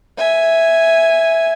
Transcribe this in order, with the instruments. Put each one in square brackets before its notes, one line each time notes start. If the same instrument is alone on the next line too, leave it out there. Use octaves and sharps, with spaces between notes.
[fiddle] E5 G#5